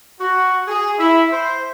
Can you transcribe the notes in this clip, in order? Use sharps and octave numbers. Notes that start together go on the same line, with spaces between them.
F#4
G#4
E4
C5